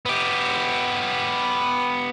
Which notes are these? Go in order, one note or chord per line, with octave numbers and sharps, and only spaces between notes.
B3 G4